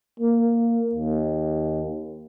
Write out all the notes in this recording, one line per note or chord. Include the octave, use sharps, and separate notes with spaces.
A#3
D#2